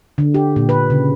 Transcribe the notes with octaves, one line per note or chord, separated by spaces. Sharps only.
D3
G4
A#2
B4
C#3